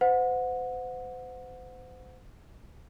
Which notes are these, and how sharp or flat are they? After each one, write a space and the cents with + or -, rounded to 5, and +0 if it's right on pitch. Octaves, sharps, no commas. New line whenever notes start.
C5 -35 F#5 -25